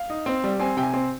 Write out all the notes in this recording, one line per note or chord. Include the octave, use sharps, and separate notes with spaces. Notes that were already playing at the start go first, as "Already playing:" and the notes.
Already playing: F5
D#4
C4
G3
C4 G#5
C3 G5
G#5
C4